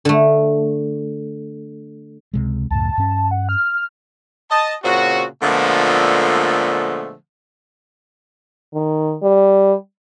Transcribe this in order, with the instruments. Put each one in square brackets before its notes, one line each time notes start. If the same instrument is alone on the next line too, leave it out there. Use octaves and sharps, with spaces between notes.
[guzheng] D3 A3
[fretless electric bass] C#2 C3 G#3
[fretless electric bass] C#2 F#2 A2 [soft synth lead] A5
[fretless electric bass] G2 C#4
[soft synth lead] F#5
F6
[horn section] D#5 A5
A#2 C#3 C4 F#4
A#2 D3 F3 G#3 A3 B3
[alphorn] D#3
G3